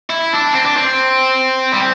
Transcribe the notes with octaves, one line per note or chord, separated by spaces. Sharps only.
E4
D4
C4
D4
C4
G3